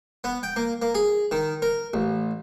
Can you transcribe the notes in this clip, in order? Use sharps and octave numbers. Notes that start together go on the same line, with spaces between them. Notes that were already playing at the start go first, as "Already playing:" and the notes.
B3
G5
A#3
A#3
G#4
D#3
A#4
A1